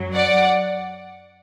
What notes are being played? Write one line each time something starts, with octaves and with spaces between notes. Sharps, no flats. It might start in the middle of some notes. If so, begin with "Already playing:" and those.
Already playing: F#2 F#3
D5 F#5